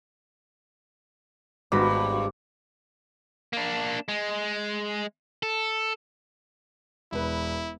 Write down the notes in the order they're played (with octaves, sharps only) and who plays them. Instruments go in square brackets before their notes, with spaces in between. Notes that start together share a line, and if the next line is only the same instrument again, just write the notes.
[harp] G#1 B5 A#6 [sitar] G2 [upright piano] B3 F#4 [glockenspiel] D6
[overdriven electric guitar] A#3 D4
G#3
A4
[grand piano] E1 B4 [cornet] E4